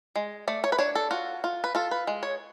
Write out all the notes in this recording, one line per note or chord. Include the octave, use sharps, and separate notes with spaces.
G#3
A3 D5
C#5
B4
D4 C#5
A4
F4 F#4
F4
B4
F4 A4
B4
G#3
C#5